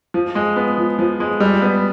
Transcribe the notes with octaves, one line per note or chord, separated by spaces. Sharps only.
F3
G#3
B3
F3
F3
G#3
G3
B3